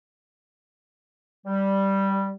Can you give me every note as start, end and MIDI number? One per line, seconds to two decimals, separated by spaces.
1.46 2.33 55